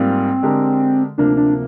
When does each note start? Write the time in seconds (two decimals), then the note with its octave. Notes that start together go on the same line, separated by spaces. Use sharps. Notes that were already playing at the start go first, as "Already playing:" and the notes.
Already playing: G#2 G3 A#3 C4 F4
0.43 D3 G#3 D4 G4 A#4
1.18 D2 C3 F3 A#3 D4
1.37 D4